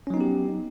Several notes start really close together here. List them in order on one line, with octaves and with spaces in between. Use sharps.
C#4 F#3 D#4 B3 G4